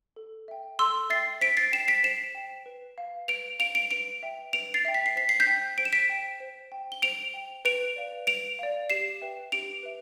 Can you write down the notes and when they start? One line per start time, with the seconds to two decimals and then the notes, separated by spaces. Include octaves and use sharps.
0.16 A4
0.48 E5 G5
0.79 A4 C6 E6
1.10 E5 G5 A6 C7
1.41 C5 B6 D7
1.57 A6 C7
1.72 G5 C7 E7
1.88 B6 D7
2.03 C5 C7 E7
2.35 G5
2.66 B4
2.98 F5
3.28 B4 D7 F7
3.59 F5 D7 F7
3.75 D7 F7
3.91 B4 D7 F7
4.23 E5 G5
4.53 B4 D7 F7
4.74 A6 C7
4.85 E5 G5
4.94 B6
5.06 C7
5.16 C5 B6
5.29 C7
5.40 G6 B6
5.47 G5
5.78 C5 D7
5.85 E7
5.92 B6 D7
6.09 G5
6.40 C5
6.72 G5
6.92 G7
7.02 C5 D7 F7
7.34 G5
7.65 B4 D7 F7
7.96 D5 F5
8.27 B4 D7 F7
8.59 D5 F5
8.90 G4 C7 E7
9.21 B4 E5 G5
9.52 G4 D7 F7
9.83 B4 E5